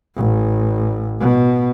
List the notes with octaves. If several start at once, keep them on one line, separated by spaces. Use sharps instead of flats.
A1
B2